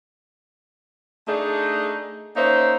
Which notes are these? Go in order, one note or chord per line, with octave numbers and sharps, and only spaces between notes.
A3 D4 D#4 G#4
A#3 C#4 D#4 C5 E5